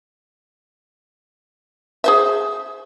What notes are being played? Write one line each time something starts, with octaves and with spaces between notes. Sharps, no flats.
G#4 C5 E5